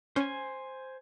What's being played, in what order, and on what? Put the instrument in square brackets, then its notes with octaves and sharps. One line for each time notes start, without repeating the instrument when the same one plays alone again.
[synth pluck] C#4 [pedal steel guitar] C5 G#5